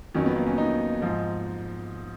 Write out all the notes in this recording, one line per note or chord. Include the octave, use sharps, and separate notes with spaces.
F2 D#3 F#3 C#4
B3
A#3
C#4
D#4
G#2 F3